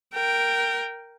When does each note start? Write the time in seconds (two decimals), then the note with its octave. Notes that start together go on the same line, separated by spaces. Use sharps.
0.14 A#4 G5